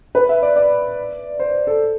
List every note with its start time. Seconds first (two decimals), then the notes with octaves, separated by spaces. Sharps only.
0.15 B4
0.29 E5
0.42 D5
0.56 D5
1.39 C5
1.67 A4